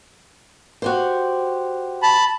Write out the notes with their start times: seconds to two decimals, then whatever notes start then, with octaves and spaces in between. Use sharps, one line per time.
0.82 F#4 G4 C5
2.02 A5 B5